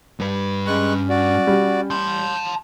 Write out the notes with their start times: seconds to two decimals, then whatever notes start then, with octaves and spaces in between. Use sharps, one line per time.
0.20 G2 B4
0.67 G#3 C#4 C#6 F#6
1.10 F#4 D5
1.47 G3
1.90 A5 C6 G6